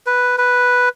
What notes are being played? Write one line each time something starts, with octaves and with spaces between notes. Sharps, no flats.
B4
B4